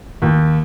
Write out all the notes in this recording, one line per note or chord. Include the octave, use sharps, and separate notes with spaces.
D#2